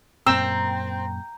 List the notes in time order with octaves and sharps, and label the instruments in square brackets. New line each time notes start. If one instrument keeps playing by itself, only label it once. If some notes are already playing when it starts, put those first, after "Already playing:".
[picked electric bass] F#2 A#2 [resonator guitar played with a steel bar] C4 [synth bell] A#5 G6 [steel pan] E6